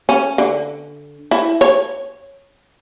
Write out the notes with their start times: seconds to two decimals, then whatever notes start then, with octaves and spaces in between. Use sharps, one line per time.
0.09 C#4
0.38 D3
1.31 E4
1.61 C#5